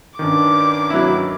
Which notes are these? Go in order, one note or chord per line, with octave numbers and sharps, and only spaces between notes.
G2 D#3 C#4 D4 D6
F#3 E4